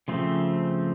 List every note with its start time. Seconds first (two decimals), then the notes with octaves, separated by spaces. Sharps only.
0.08 C#3 F3 A3 C4